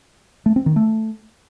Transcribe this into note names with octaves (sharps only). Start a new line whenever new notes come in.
A3
C4
D#3
A3